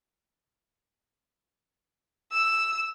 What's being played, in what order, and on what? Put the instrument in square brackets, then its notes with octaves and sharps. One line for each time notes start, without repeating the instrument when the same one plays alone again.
[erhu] E6